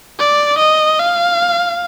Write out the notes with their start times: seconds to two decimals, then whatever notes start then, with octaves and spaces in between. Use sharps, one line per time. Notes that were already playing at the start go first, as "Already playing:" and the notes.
0.19 D5
0.59 D#5
1.00 F5